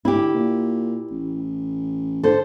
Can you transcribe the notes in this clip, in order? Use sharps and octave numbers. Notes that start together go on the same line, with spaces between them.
D3 E4 G4
A#2
A1
D3 A4 C5